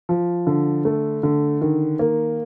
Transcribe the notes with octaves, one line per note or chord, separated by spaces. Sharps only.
F3
D3
A3
D3
D#3
A#3